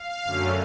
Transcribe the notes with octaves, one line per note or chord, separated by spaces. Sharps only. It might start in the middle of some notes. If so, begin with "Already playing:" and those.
Already playing: F5
F#2 D3 F#3 A3 C#4